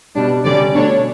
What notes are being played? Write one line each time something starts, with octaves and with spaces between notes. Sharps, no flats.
B2 G3 D4
D3 G3 C#4 D5
B2 A3 D4 C#5